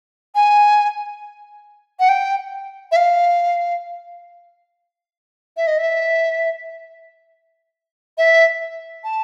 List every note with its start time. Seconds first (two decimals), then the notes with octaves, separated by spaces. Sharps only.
0.35 G#5
2.00 F#5
2.09 G5
2.92 E5
2.96 F5
5.57 E5
5.67 D#5
5.79 E5
8.18 E5
9.04 A5